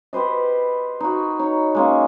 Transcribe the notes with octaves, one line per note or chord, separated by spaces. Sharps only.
G4 B4 C5 D#5
D#4 F#4
D#4 C#5
G#3 A#3 C#4